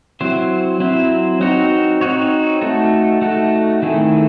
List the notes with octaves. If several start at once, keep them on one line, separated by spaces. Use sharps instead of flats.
F#3 C4 E4 C5
F#3 C4 E4 C5
C4 D#4 F#4 C#5
C4 D#4 F#4 C#5
A3 D#4 F#4 A4
A3 D#4 F#4 A4
D#3 A3 C4 E4 G#4